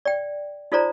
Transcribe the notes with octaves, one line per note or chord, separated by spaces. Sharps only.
D5 G5
D#4 F4 A4 C5 D5 A#5